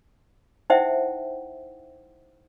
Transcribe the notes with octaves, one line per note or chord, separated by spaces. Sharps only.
D#4 E4 C5 E5 F#5 G5